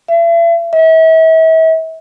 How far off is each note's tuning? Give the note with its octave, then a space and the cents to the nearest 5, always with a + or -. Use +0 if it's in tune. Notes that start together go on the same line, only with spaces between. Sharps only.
E5 +40
E5 -40